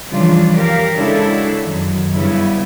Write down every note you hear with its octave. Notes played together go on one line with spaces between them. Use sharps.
C#3 E3 F3 G3 D4 F4
G4 A#4 F5
C#3 G#3 D4 E4 F#4 A4
F#2 D#3 F#3
G2 C#3 B3 E4